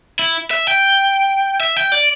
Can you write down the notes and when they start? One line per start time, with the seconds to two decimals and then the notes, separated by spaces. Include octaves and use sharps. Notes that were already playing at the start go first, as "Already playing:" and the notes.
0.19 E4
0.51 E5
0.67 G5
1.60 E5
1.77 G5
1.92 D5